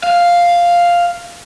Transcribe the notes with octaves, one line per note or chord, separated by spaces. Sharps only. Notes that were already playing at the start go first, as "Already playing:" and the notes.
F5